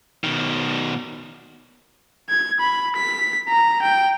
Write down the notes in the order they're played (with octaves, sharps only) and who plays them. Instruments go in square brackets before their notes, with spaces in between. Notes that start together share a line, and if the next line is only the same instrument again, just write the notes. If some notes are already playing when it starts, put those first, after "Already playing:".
[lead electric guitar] B2 D#3
[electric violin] G#6
B5
B6
A#5
G5